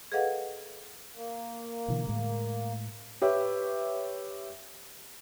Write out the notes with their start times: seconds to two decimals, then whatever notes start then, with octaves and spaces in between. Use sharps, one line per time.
0.12 G#4 A4 B4 D#5 F5 F#5
1.14 A#3
1.88 B2 D3 E3
2.07 A2 G#3
3.22 G4 B4 C#5 E5